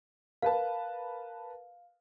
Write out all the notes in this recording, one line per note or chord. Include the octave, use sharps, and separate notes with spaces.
A#4 B4 F5 A5